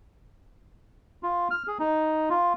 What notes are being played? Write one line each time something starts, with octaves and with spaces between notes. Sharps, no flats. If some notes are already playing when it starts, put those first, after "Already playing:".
F4
F6
G#4
D#4
F4